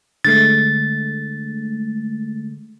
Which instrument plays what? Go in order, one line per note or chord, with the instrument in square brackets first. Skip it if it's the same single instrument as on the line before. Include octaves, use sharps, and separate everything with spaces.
[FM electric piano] D3 G#3 A3 [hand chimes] A6